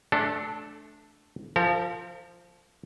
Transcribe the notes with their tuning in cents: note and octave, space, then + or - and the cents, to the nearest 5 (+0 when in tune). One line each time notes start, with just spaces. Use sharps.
A3 -25 D4 +0 A4 +0
F3 +0 A#4 -45